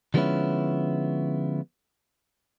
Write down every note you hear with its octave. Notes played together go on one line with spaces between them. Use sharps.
D3 F3 G#3 B3 C#4 E4